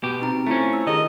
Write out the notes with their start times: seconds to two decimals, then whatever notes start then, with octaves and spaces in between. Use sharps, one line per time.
0.03 B2 G4
0.21 C4 D#4 A#5
0.47 A3 C#4 E4 F4 C5
0.73 E6
0.87 D#3 G4 G#4 D#5 A#5